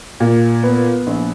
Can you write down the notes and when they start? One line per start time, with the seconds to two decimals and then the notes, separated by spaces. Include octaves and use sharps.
0.20 A#2
0.63 B3
1.07 A#1